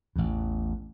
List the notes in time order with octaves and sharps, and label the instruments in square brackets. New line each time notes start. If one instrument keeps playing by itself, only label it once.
[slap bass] A1 E2